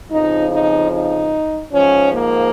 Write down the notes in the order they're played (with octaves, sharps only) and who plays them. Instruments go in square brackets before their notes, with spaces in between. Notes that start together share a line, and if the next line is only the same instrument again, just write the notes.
[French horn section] F2 C#3 F3 D#4
D#4
D#4
G#2 F3 C#4
A#3